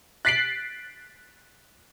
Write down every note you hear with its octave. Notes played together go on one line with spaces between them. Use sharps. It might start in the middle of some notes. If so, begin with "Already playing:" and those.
F#6 A6 B6 C7 D7 F#7